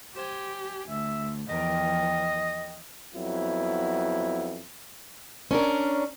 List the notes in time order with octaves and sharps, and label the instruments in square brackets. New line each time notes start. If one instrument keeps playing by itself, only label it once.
[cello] G4 [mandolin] C5 G#5
[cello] D2 [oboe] E5
[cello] E2 F3 [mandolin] G4 A#4 [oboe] D#5
[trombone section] F2 F#3 B3 E4
[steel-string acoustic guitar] C#4 D4 A#4